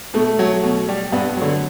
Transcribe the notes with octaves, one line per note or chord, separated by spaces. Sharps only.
B2 A3
F#3
B2
G3
G2 B3
D3 F#3